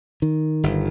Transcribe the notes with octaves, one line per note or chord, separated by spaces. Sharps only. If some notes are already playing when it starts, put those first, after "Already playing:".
D#3
G1